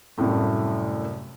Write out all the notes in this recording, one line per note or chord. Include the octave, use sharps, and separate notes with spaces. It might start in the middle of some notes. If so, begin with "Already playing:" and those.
C2 F#2 A2 A3